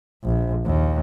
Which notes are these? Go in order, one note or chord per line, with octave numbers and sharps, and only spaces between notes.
A#1
D#2